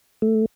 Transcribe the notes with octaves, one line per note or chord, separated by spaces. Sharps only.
A3